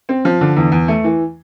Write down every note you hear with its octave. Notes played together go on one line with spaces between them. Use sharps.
C4
F3
D3
E2
E2
A3
E3